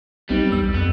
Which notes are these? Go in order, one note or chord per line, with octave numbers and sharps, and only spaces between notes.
B1 G3 B3 C4 D#4
E2 E6
F2 B3